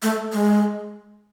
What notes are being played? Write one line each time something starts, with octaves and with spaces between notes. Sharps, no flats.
A3
G#3